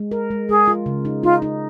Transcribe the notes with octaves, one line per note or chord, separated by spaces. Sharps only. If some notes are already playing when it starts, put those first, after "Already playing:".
Already playing: G#3
A#4
G#3
G#3 G#4
F4
C#3
D#4
D#4 F4
D#4